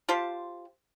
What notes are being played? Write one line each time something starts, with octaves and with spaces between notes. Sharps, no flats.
F4 G4 C5 A5